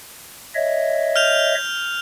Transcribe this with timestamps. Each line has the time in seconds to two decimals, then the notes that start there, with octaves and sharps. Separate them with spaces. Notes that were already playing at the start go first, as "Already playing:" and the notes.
0.55 C#5 D#5 E5
1.16 F6 G6 F7